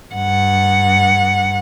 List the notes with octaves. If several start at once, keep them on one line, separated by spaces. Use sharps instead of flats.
G2 F#5